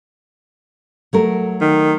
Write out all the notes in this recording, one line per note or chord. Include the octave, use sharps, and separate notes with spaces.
F#3 A3 A#4
D#3